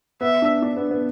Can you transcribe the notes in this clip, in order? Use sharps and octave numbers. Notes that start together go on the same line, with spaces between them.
B3 E5
D4
D4
B3
B3